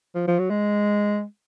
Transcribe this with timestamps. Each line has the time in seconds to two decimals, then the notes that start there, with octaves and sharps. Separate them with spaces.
0.15 F3
0.28 F3
0.39 F#3
0.50 G#3